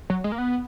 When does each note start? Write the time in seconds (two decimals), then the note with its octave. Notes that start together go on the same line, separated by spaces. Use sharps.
0.10 F#3
0.24 G#3
0.32 A#3
0.38 B3